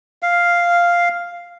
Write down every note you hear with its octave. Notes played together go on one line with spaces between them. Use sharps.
F5